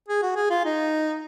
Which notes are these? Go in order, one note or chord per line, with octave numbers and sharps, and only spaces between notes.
G#4
F#4
G#4
F4
D#4